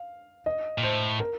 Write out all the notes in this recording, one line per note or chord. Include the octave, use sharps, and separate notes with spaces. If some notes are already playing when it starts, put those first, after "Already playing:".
Already playing: F5
D#5
A#2
A2 C5
A#4